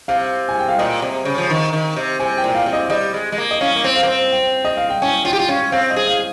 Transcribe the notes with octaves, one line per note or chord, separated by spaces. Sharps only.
C3 F5
G#5
G5
F5
A#2 D#5
C3
C#3
F3
D#3
D#3
C3
C3 G#5
G5
A#2
F5
C3
D#5
G3 D#5
G#3
G#3
A#3
D#5
C#4 F5
A#3
C4
F5
A#3
C4
G5
D#5
F5
G5
C#4 G#5
F4 G5
G4
F4
C#4 F5
C4 F5
D#5
G#4
F5